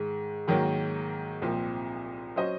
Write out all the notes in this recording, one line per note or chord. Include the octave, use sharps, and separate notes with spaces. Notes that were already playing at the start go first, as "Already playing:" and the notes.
Already playing: G#2 D#3 G#3
G#2 D#3 F#3 A#3
C2 A#2 F3 C4
F#3 C#4 F#4 C5 D#5